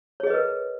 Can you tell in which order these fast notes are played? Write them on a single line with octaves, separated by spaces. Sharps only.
C#5 G#4 D#5 B4 A#4